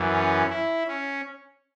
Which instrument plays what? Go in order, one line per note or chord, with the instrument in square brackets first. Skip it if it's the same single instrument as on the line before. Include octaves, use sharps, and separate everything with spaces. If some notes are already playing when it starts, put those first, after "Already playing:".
Already playing: [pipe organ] F#2 E3
C#4
E4
C#4